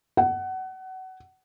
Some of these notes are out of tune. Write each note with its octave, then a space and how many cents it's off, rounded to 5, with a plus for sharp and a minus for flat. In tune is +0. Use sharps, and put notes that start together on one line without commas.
F#5 +25